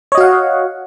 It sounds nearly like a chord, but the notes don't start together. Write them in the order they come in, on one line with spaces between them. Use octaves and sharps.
C#5 D#5 F#4 F5 F#5